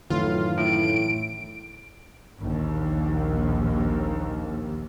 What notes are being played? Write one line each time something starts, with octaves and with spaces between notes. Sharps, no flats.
F#2 A2 D#3 E3 F4
A2 E4 D7
A#1 D#2